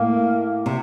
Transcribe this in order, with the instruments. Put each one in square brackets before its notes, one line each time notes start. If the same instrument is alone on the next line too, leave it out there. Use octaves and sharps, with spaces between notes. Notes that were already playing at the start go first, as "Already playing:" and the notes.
Already playing: [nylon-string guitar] A2 [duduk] A#3
[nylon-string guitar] C3